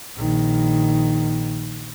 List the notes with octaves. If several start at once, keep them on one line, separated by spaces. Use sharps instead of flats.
A#1 D#3